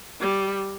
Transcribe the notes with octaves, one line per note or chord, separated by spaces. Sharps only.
G3